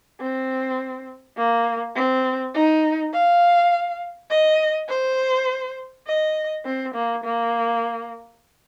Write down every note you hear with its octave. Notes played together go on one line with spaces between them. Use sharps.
C4
A#3
C4
D#4
F5
D#5
C5
D#5
C4
A#3
A#3